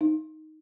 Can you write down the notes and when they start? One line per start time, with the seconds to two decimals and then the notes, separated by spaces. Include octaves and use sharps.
0.01 D#4